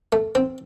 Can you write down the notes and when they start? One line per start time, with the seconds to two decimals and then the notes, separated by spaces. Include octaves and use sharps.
0.12 A3
0.35 C4